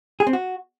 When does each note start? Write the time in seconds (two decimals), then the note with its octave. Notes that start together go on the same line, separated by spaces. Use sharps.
0.20 G#4
0.27 C4
0.33 F#4